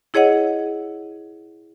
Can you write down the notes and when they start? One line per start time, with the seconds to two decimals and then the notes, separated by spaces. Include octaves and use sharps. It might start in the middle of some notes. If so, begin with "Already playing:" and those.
0.14 E4 G#4 C#5 D#5 F#5